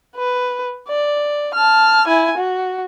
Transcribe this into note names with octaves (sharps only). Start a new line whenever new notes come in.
B4
D5
A5 F6
E4 G#5
F#4